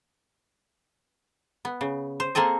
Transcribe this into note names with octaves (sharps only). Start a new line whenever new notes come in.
B3
C#3
C5
A#3 C4 G#4 A4 D#5